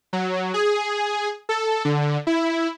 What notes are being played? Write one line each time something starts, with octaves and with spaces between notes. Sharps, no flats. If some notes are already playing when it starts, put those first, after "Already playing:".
F#3
G#4
A4
D3
E4